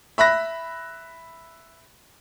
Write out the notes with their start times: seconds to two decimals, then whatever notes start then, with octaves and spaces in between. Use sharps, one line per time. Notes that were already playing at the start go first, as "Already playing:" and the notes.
0.18 E5 B5 F#6 A#6